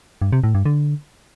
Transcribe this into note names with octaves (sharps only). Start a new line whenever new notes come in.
G2
C3
A2
G2
D3